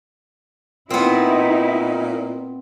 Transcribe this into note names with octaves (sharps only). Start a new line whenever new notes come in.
A#2 B3 C4 D#4 E4